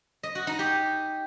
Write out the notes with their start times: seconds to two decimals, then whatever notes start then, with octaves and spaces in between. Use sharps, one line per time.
0.23 D#5
0.35 F#4
0.47 D#4
0.59 G4